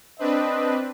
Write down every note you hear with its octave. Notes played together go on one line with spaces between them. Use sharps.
C4 D4 B4 D#5